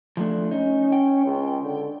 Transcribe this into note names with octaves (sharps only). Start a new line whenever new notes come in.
F3 A3 D4
C#4 D#4
G5
C#2
D3